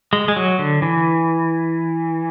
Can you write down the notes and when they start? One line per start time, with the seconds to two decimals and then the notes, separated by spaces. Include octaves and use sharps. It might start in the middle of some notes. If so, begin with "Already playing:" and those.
0.13 G#3
0.28 G#3
0.36 F#3
0.59 D3
0.82 E3